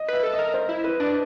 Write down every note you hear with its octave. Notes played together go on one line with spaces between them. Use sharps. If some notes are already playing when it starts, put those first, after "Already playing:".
Already playing: D#5
B4 E5
A4
D#5
A#4
C5
E4
B4
D4